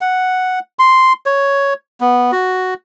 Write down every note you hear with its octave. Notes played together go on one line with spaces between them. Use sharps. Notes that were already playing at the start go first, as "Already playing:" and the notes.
F#5
C6
C#5
B3
F#4